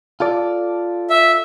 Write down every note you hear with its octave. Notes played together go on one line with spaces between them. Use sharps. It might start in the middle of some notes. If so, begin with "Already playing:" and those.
F4 A4 D5
E5